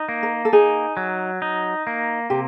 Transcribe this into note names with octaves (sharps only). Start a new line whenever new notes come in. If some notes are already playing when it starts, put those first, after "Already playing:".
Already playing: D#4
A#3
A#4
A4
D#4 G#4
F#3
D#4
A#3
C3 G4